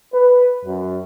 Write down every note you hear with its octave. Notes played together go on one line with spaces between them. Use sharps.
B4
F#2